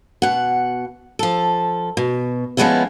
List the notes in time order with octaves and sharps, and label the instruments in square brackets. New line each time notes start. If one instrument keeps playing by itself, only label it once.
[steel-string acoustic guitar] B2 F#5
F3 A4
B2
F3 G#3 A3 B3 C#4 E4